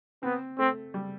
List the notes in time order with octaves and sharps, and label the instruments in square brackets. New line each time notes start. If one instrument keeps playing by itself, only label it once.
[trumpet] B3 [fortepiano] C4
[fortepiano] A3 [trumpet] C4
[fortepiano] G3